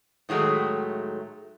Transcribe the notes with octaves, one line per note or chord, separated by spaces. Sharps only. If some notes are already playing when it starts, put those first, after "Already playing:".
A2 D#3 F#3 G#3 A3